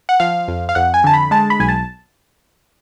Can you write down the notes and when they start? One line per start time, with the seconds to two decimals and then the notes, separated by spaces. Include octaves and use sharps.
0.09 F#5
0.20 F3 F5
0.48 F2
0.69 F5
0.75 F2 F#5
0.94 G#5
1.04 D3 A5
1.14 B5
1.31 G#3 A5
1.50 B5
1.60 B1 G#5
1.69 A5